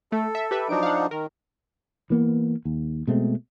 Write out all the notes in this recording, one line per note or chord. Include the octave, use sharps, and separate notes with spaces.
A3 A4
E5
G4 B4 E5
F3 F#3 D4 D#4 D7
F5 F#5
D#3 A#4
E3 A#3 B3
D#2
B2 G#3 A3 C4